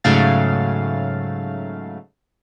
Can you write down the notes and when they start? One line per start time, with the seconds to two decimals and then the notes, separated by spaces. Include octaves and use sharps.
0.04 G#2 C#3 F#3 A3 F5 A6